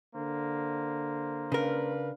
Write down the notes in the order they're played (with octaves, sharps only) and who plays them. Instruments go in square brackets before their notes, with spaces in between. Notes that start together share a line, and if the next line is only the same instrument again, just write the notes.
[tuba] D3 [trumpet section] A#3 C5
[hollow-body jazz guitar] C#3 A#4 [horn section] D4 B4 F5